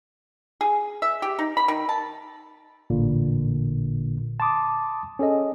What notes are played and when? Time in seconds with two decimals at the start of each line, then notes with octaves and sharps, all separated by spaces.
0.61 G#4
1.02 E5
1.22 G4
1.39 D#4
1.57 B5
1.68 D#3
1.89 A5
2.90 A1 A#2 D3
4.40 A5 C6 D6 D#6
5.19 C#4 G#4 A4 D#5